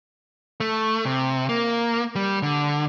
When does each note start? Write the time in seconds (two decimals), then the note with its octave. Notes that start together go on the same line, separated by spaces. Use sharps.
0.60 A3
1.05 C3
1.49 A#3
2.16 G3
2.42 D3